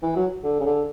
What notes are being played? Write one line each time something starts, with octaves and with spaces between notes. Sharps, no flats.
E3
F#3
D3
C#3
D3